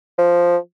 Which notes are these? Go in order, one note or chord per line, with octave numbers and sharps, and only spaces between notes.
F3